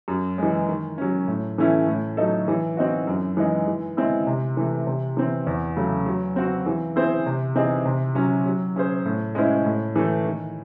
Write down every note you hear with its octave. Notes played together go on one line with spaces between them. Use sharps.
F#2
E3 G#3
D#3
F#3 C#4
A2
E3 A3 C#4 E4
A2
F#3 A3 D#4 A4
E3
C4 D#4 F#4
F#2
E3 G#3 D#4
E3
G#3 C4 E4
C3
E3 A3
C3
E3 C4
E2
C#3 F#3 A3
F#3
C4 F#4
E3
C4 E4 G#4 C5
C3
E3 C4 D#4 G#4
C3
F#3 C#4
F#3
C#4 G#4 C5
A2
G#3 C#4 E4 C5
A2
E3 A3
D#3